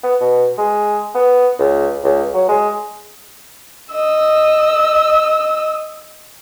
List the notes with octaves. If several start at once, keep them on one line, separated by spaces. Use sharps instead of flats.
B3
B2
G#3
B3
C#2
C#2
F#3
G#3
D#5 E6